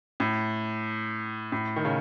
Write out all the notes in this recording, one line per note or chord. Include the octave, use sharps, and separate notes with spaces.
A2
A2
D#3
C#3